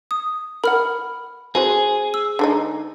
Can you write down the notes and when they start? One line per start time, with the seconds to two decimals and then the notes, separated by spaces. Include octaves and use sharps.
0.11 D#6
0.64 A#4 F#5 B5 F6
1.55 C4 F#4 G#4 C5
2.14 E6
2.39 D3 G#3 D#4